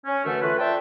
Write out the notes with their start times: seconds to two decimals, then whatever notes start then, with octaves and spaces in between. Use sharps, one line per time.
0.05 C#4
0.25 F#2 D3 E3 A3
0.41 A3 F4 B4
0.59 C5 D5 E5 G5 A5